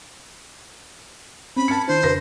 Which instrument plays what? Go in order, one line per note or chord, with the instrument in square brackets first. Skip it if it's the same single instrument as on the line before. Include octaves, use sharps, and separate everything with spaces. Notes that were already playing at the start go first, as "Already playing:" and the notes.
[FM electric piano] C4 C#4 [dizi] B5
[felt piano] A5 C#7 [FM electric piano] F6 G#6
[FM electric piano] D#3 D4 E4 [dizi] C5
[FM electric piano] F2 C#3 [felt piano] B4 C6 A#6